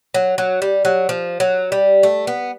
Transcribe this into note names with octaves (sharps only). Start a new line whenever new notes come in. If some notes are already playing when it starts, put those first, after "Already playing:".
F#3
F#3
G3
F#3
F3
F#3
G3
A3
B3